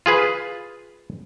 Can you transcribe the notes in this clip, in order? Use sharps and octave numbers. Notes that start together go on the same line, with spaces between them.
F4 G#4 B4